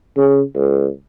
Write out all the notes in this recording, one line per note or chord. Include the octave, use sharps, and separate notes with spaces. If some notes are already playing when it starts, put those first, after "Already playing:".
C#3
C#2